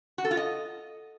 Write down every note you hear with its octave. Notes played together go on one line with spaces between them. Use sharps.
F#4
A4
F4
D#5